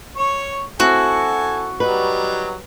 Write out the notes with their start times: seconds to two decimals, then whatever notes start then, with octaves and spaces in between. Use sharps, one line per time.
0.17 C#5 C#6
0.80 C4 E4 F#4 A4 G#5
1.80 F#3 G3 D#4 B4